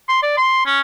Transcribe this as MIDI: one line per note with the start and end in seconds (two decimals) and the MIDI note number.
0.09 0.21 84
0.23 0.35 74
0.37 0.61 84
0.66 0.81 61